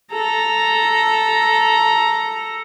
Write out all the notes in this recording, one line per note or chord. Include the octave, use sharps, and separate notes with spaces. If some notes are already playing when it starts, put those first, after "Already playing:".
A4 A#5